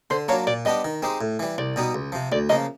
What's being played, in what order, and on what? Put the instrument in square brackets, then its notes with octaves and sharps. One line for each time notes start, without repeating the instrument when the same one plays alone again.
[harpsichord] D3 [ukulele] C5
[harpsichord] F#3 A#3 D4 F4 [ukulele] C#5
[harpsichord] A#2 [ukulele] D5
[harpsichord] G3 B3 D4 G4 [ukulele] D#5
[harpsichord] D#3
G#3 C4 D#4 G4
A2
E3 G3
[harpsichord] C2 [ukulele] D5
[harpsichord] B2 G3 B3 D#4
C#2
C3 F3
[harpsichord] D2 [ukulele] D5
[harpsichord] C#3 F3 A#3 [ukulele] D#5